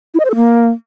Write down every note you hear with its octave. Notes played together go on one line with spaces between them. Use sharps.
E4
D#5
C5
A4
A#3